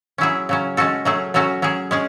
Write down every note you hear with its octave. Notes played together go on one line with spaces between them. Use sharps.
F#3 C#4 E4 G#4
C#3 F#3 C#4
G#3 C#4 F#4 A4
F#3 A3 C#4 G#4
F#3 A3 C#4 F#4
F#3 C#4 G#4
G#3 C#4 G#4